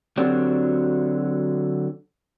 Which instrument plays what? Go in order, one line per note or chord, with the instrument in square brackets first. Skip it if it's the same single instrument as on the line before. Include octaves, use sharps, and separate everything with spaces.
[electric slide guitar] D3 F#3 C4 D4 F#4 G4